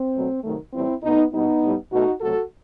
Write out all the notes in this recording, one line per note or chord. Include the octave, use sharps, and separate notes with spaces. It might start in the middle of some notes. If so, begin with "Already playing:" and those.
Already playing: C4
B2 F#3 A3
C3 D#3 F#3 A3
A2 E3 G3 C4 E4
B2 A3 B3 D#4
B2 G3 B3 D#4
A2 G3
B2 A3 D#4 F#4
C3 F#3 A3 F#4 A4